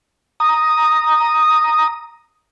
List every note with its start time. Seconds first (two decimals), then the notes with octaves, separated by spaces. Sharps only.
0.40 A#5 D#6